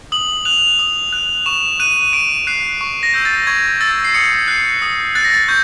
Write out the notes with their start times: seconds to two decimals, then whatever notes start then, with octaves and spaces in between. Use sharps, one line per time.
0.12 D#6 F#7
0.45 F#6 F7
0.79 D#6
1.12 F#6
1.46 C#6 E7
1.80 F#6 D#7
2.13 C#6 D7
2.47 F#6 C7
2.81 C#6
3.03 A#6
3.14 E6 G6
3.25 A6
3.47 C#6 G#6
3.81 E6 G6 A6
4.05 C7
4.14 D#6 C#7
4.48 F#6 C7
4.82 D#6
5.15 F#6 A6
5.24 A#6
5.33 A6
5.48 C#6 G6